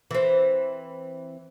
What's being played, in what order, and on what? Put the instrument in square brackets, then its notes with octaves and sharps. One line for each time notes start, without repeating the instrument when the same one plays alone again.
[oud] E3 C4